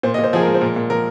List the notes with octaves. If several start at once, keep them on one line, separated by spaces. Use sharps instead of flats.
A#2 C5
D#5
A#2
C5
F3 G#4
A#4
G#3
C5
A#2 A#4
A#2
F3 A#4